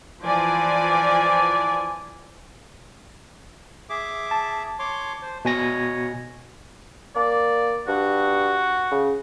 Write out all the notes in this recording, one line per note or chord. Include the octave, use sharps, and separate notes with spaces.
E3 F3 D5 G#5
G#4 E5 D6
A5
C#5 C6 D6
C5
B2 C#5 G#5 A#6
A#3 D5
G2 F#4
C#3